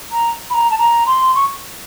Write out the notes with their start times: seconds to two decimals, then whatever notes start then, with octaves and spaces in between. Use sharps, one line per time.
0.12 A#5
0.50 B5
0.54 A#5
0.71 A5
0.78 A#5
1.06 C6
1.35 C#6